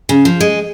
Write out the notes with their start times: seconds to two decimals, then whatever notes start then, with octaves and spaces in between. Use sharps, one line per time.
0.09 C#3
0.25 F3
0.40 G#3